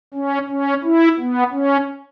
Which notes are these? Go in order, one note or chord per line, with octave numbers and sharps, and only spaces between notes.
C#4
C#4
E4
B3
C#4